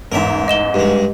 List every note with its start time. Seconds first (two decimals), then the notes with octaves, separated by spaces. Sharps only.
0.12 A1 E2 G#2 A#4 E5
0.48 D#5 E7 G7
0.74 G2 G#3 G4